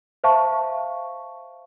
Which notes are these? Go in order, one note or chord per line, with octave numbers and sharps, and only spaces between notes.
C5 E5 F5 A5 C#6